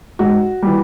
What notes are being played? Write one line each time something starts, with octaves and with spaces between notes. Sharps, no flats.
G#2 F#4
E3 G3